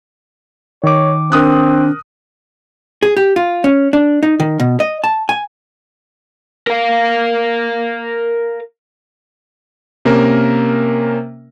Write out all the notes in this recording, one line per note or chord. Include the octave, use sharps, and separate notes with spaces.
D#3 C#5 D6
C4 D4 A#4 D#6 F#6
G#4
G4
F4
C#4
D4
D#4
D#3
B2
D#5
A5
G#5
A#4 F5
C3 A#3 C#4 A#4